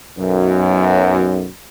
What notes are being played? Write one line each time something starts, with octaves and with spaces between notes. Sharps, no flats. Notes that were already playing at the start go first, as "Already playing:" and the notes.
B1 F#2